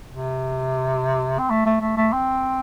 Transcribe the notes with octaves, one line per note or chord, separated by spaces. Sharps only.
C3
C4
A3
A3
A3
A3
C4